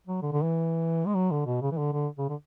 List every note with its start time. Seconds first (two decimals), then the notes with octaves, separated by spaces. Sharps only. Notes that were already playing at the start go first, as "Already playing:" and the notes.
0.07 F#3
0.22 D3
0.33 D3
0.42 E3
1.07 G#3
1.15 F#3
1.31 D3
1.46 B2
1.62 C#3
1.72 E3
1.78 D3
1.93 D3
2.19 C#3
2.29 D3